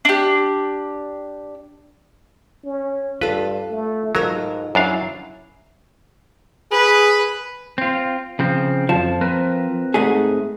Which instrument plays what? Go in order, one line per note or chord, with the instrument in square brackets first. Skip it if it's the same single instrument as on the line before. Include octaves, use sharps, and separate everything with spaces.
[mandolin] D4 G4
[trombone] C#4
[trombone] G2 [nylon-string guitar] F4 A4 [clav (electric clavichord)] B4
[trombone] A3
[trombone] G#2 [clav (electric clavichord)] F#3 [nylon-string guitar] F4 A4 A#4
[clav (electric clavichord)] F#2 D4 F5 [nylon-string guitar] F#3 [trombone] E4
[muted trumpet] G#4 [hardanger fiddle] B4
[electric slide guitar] C4 F4
C#3 F3 C4
[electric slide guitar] F2 A5 [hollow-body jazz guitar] F3
[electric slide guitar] C4 A#4 B4
[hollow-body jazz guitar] G#2 A3 G#4